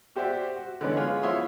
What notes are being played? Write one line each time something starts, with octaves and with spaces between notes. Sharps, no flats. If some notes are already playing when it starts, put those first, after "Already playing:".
F#4 G4 C5 D5 E5 G5
F#4
D3 E3 G#3 B3 C#4 D4
F4 G#4 C#5
F3 E4 C#5 E5 C6 D#6